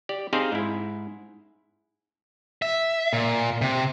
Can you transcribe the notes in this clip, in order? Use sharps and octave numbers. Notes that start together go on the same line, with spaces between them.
G4 D5
C4 D#4 G4 G#4 C5 F5
G#2 E4
E5
A#2
C3